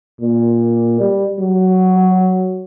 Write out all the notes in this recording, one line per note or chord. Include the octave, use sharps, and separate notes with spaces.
A#2
G3
F#3